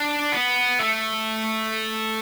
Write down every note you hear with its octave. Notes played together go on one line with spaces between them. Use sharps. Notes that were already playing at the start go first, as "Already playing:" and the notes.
Already playing: D4
B3
A3